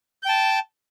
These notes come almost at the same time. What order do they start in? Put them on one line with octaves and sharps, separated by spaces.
G6 G5 A5